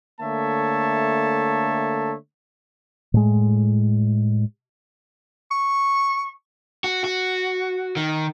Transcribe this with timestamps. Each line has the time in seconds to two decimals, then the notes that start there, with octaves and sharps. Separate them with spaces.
0.21 D3 A3 A#3 C#5 E5 A5
3.14 A2 G#3
5.51 C#6
6.84 F#4
7.04 F#4
7.97 D#3